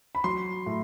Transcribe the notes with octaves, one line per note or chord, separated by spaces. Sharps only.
B5
F#3 C6
A2